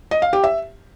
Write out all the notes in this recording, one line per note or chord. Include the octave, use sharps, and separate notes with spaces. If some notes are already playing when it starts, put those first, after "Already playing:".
D#5
F5
G4
E5